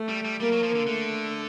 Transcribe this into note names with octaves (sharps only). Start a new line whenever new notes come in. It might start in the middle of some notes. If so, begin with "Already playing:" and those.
Already playing: A3
G3
G3
G3 A#3
F#3
F3
D3
D3 A3